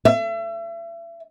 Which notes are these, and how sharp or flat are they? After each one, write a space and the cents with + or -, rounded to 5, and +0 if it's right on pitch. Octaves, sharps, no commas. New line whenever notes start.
E5 +35